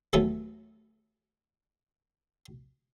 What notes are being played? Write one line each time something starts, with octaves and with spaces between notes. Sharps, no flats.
D#2 E3 F#3 A3 B3